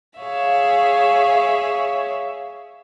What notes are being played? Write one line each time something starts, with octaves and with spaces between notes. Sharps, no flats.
G#4 C#5 E5 F5